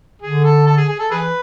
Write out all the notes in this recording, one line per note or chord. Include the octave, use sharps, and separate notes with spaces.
D3 G#4
A4
A4
G#4
G#4
A4
E3 G#4 B4